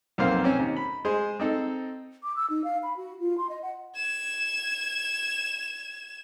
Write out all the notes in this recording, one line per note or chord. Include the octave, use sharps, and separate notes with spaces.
B1 F2 A#3 C4 C5 F5
C4 C#4
D#2
B5
G#3 G#4 C5
C4 D#4 A4
D6
E6
D#4
F5
B5
F#4
F4
C6
D#5
F#5
G#6 E7